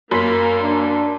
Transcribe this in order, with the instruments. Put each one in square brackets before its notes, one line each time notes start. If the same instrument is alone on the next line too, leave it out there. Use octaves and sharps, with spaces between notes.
[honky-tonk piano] F#2 [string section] A#3 [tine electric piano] B5 C6 B6
[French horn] D4